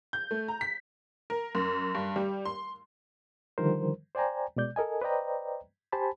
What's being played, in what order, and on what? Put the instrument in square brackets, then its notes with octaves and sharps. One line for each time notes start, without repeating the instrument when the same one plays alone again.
[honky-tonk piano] G6
A3
A#5
B6
A#4
F#2
G2
G3
C6
[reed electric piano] D3 D#3 F3 G3 A#4 C5
C5 D5 G5 G#5 A#5
B2 G#3 D5 G6
A4 A#4 D#5 G#5
B4 C5 D5 D#5 G5 A#5
G4 C5 G#5 A5 B5